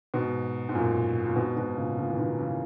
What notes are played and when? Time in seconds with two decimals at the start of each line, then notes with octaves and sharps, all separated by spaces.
0.14 G#2 B2
0.69 G#2
0.75 F#2 A#2
1.26 A#2
1.36 G#2 B2
1.56 G#2 B2
1.77 A#2 C#3
1.98 A#2 C#3
2.10 E3
2.19 B2 D#3
2.38 C#3 E3